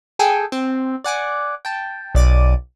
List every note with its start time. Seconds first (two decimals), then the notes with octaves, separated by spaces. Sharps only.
0.19 G#4 A4 G5 G#5
0.52 C4
1.04 D5 F#5 G#5 D6
1.65 G5 A5
2.15 B1 D5 D6 D#7